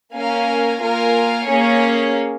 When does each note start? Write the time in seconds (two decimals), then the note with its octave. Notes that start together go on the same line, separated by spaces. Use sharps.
0.15 A#3 C#4 A#4 F5 G#5
0.81 A#3 F4 A#4 F5 G#5
1.47 A#3 C#4 G#4 C#5